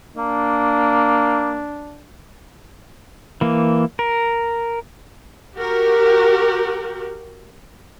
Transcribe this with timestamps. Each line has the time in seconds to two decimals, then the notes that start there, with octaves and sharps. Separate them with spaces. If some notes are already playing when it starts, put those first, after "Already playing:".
0.17 A#3 D4
3.41 E3 A#3
3.99 A#4
5.57 F#4 G4 A#4